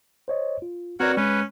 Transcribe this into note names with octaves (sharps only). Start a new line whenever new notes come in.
C5 C#5 D#5
F4
C4 F#4 A#4 B4 C#5 D5 F#5
G#3 C#4 B4